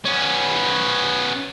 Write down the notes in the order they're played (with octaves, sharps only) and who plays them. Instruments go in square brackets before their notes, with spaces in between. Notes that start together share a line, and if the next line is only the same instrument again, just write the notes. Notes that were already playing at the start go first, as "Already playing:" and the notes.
[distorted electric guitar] B3 C#4